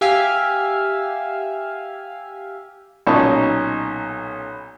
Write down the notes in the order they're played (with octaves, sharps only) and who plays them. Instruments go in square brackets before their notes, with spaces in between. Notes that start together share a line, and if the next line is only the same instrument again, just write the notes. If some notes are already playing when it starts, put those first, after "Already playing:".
[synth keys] G4 E5 F5 G#5 F6
[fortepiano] B1 A#2 C#4 D#4 A5 C#6